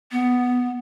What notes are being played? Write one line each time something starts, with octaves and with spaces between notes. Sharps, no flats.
B3